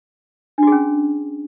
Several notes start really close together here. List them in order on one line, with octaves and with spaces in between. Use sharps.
D4 F#4 G#4 C#4